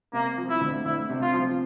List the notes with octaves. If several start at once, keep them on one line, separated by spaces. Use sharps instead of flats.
C3 A#3
F3
E4
D2
D2 E4
C3
F4
F3